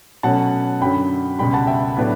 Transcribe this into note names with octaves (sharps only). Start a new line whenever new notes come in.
B2 F#3 A3 C#4 F#5 A5
F#2 D3 F#3 G5 B5
C#2 B2 G3 G5 B5
F#5 A5
E5 G5
A2 F#3 B3 D4